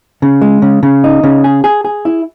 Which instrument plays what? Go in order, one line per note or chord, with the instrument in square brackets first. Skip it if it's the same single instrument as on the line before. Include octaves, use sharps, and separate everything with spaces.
[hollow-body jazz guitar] C#3
G#3
C#3
C#3
D#4
C#3
G#4
G#4
G#4
E4